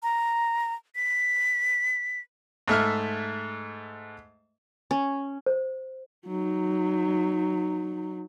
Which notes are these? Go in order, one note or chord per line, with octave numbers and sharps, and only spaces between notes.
A#5
B6
G#2 A3 E5 F6
C#4
C5
F#3 D#4